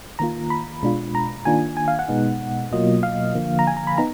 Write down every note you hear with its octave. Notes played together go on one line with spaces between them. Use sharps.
D#3 A#3 F4 A#5
B5
B2 G#3 D4 F4
A#5
D#3 A#3 D4 F4 G#5
G#5
F5
F#5
B2 G#3 B3 D#4
B2 F#3 A#3 F4 D#5
F5
D3 F3 A#3
A#5
G#5
A#5
B5
B3 D#4 A#5